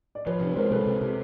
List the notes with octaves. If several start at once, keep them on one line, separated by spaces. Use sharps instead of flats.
D5
F3 B4 C#5
C3
G#3 A#4 C5
C3 A4 B4
C3
C3